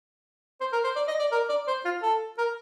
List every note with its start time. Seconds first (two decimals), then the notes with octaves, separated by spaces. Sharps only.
0.61 C5
0.73 A#4
0.84 C5
0.96 D5
1.08 D#5
1.19 D5
1.32 A#4
1.49 D5
1.67 C5
1.85 F4
2.02 A4
2.38 A#4